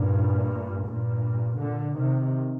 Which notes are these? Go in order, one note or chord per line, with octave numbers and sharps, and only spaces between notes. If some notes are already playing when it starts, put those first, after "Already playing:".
Already playing: G2 A#2
G2 A#2
A#2 D3
C3 D#3